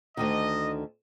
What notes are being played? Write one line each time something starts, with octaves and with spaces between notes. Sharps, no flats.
D2 D3 D#3 D#5